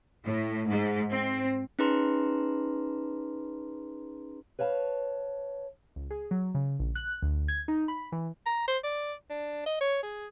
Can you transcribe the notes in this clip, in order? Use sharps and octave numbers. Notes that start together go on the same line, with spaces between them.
A2
G#2
C4
C#4 D#4 G#4 B4 A#5 C6
B4 C#5 F5 A5
C#2
G#4
F#3
C#3
A#1
F#6
D2
G#6
D#4
B5
E3
A#5
C5
D5
D4
D#5
C#5
G#4